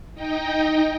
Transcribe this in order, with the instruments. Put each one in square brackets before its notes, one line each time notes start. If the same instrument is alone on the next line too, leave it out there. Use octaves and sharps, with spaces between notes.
[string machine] D#4 D#5 G5